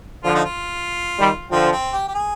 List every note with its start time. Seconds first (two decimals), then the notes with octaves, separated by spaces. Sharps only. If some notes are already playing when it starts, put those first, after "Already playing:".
0.24 D3 F3 F4
0.35 D#4
0.44 F4
1.19 D#3 G3
1.51 D3 F3 C4
1.72 C4
1.93 G4
2.08 G4
2.14 G#4